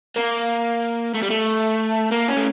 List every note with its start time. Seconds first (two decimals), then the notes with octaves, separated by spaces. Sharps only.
0.16 A#3
1.14 A3
1.23 G3
1.30 A3
2.11 A#3
2.28 C#4
2.37 A3